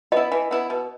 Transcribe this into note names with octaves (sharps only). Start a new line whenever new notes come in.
B3 E4 D#5
E3
B3 E4
B2